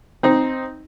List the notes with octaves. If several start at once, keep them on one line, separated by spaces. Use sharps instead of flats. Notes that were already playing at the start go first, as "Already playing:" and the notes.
C4 D#4